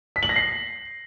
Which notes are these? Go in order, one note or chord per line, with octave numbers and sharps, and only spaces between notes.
B6
F#7
A#6
C7